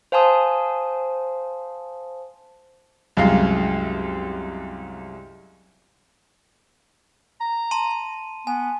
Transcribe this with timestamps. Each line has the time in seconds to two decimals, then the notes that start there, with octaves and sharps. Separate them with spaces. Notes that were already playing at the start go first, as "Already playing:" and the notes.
0.12 C5 F5 G#5 A5 C6 D#6
3.17 C2 F#2 G#3 F5
7.41 A#5
7.71 A5 C6 D#7
8.47 B3 G#5